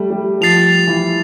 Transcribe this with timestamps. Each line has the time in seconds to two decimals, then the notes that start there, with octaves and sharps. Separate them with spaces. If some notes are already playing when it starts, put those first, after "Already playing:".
Already playing: G3 A3
0.10 G3
0.41 F3 A6 C7 F7
0.87 E3